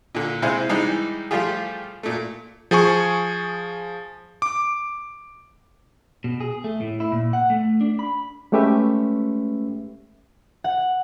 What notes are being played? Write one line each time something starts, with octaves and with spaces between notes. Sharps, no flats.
A#2 D3
C3 G#3 E4 C5 F5 G#5
E3 G3 G#3 D#4
F3 G3 A3 F4 G4 G#4
A#2 A3
F3 G#4 G#5 C#6
D6
B2
G#4
A3
A2
E4
A#2
F#5
A3
D4
B5
G#3 A3 C#4 G4 B4 E5
F#5